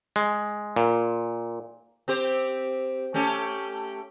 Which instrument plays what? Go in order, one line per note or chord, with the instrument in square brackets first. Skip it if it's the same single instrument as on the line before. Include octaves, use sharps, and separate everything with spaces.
[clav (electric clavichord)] G#3
A#2
[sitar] C4 G4 C5
A3 C#4 G4